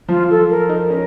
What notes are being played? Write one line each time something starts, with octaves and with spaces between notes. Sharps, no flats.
F3 F4
A4
A#4
D#4
C#4 A#4